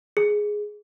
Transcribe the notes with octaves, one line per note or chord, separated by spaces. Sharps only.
G#4